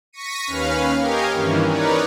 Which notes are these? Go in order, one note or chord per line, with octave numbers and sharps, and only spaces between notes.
C#6 A#6 B6 C#7 D#7
D#2 C#4 B4 F5 F6
G4 A#4 C#5 D#5 F5 G#5
G2 D#3 E3 A#3 C#4
D#4 A#4 B4 C#5 D5